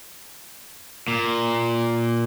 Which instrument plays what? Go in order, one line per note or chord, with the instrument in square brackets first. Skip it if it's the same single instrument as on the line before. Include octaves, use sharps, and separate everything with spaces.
[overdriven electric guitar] A#2